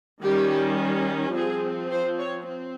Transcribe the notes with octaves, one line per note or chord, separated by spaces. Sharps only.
D#3 G3 C#4 G4
F3 C4 G#4
C5
C#5
C4